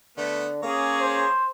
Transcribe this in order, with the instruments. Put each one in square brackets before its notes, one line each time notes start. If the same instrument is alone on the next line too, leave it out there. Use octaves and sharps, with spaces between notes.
[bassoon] D3 [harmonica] A3 B3
[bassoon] A#3 [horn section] C#4 G#4 [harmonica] C#5 A#5 D6
[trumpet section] C5